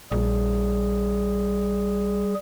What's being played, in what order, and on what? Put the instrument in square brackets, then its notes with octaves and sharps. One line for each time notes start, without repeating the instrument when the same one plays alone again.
[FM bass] A#1 [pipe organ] G3 G#4